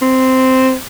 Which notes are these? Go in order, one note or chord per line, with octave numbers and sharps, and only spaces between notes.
C4